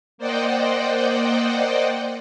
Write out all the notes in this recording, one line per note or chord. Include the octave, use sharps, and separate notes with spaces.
A#3 C5 D5 D#5 F#5 G5